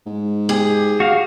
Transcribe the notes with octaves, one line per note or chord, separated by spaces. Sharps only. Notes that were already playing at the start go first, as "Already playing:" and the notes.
G#2
G4 G#4
F#4 F5